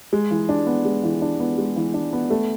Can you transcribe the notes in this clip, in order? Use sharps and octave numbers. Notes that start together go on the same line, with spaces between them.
G#3
E3
D4
B3
G#3
E3
D4
B3
G#3
E3
D4
B3
A3